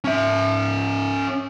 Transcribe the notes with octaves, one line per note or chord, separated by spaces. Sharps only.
C#4 E5